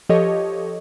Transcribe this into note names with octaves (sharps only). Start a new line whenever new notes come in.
F3 G4 A4 C#5 D#5